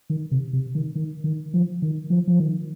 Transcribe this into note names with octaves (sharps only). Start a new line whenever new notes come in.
D#3
C3
C3
D#3
D#3
D#3
F3
D#3
F3
F3
D#3